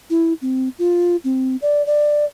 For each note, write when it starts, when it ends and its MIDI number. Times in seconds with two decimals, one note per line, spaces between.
0.10 0.33 64
0.42 0.69 60
0.79 1.16 65
1.24 1.56 60
1.62 1.85 74
1.86 2.25 74